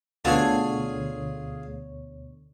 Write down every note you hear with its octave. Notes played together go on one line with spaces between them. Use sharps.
D2 B2 D3 F4 G#4 C#5 G#5